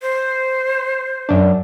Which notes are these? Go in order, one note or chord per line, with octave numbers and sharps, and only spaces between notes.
C5
F#2 D4